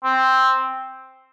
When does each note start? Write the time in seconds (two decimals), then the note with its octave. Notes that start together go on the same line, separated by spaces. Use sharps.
0.04 C4